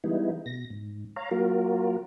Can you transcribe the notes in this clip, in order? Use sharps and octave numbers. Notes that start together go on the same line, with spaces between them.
E3 G3 G#3 B3 D#4 E4
B2 A#6
G#2
C#5 F5 A#5
F#3 A#3 F4 F#4 A#4